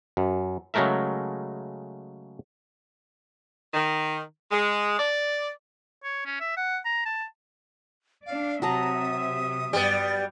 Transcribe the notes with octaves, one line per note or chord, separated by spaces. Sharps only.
F#2
C#3 F#3 G#3 A3 A#4 E5
D#3
G#3
D5
C#5
C#4
E5
F#5
A#5
A5
D4 D5 F5
C3 F#3 E5 A5 A#5 D#6
G2 G3 B3